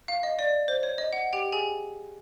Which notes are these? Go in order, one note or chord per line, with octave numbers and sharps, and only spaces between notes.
F5
D#5
D5
C5
C#5
D#5
F#5
G4 G5
G#4 G#5